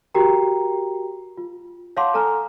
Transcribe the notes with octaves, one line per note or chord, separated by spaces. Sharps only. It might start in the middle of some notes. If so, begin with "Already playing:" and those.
F#4 G4 A#4 G5 A#5
F4
C#5 F5 F#5 A5 C6 D6
A4 G#5 A#5 F6